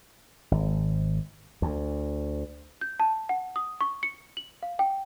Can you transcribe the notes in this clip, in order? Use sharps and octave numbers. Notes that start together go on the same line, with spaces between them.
G#1
D2
G6
A5
F#5
D#6
C#6
C#7
F#7
F5
G5